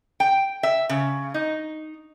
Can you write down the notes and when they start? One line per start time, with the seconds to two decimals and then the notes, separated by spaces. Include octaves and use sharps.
0.20 G5
0.63 E5
0.89 C#3
1.34 D#4